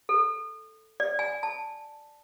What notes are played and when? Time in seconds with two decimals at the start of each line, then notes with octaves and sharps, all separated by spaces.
0.09 A4
1.00 D5
1.19 G#5
1.43 A5